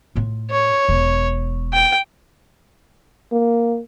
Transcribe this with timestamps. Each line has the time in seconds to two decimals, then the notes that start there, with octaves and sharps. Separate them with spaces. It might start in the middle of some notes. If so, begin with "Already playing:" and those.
0.16 A2 F4
0.51 C#5
0.89 E1
1.73 G5
3.32 A#3